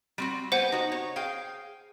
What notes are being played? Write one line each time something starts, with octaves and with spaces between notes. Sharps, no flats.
G3 C4 F#4
B3 G4 C5 F#5 G#5
D#4 F#4
C#5
G#4 F5 G5